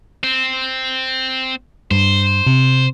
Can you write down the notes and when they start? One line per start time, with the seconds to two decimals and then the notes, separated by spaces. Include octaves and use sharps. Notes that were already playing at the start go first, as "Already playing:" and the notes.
0.23 C4
1.91 G2 C5
2.46 C3